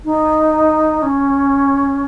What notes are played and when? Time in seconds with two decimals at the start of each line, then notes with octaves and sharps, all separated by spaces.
0.05 D#4
1.02 C#4